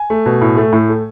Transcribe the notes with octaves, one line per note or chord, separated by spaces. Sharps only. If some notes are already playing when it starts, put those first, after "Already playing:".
Already playing: G#5
A3
B2
A2
A3
A2
A3